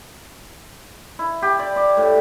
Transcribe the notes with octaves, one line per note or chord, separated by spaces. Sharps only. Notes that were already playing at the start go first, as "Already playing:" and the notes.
E4
G4
D5
D5
A2